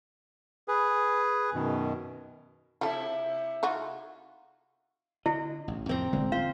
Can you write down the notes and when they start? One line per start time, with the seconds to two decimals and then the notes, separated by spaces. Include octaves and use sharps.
0.68 G#4 B4
1.54 F#2 B2 D#3
2.81 C3 E4 F4 A4
3.63 D#4 F4 F#4
5.26 D3 E4 D#5
5.68 A1
5.89 F2 A2 C3 C4 A#5
6.13 D#1 A1 D3 G#3
6.32 F4 C5 F5